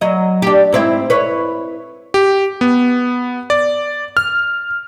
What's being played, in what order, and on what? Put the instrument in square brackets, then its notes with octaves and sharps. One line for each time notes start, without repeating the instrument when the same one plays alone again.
[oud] F#3 D#5
D4 G4
G#2 C4 E4
B4 C#5
[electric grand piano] G4
B3
D5
F6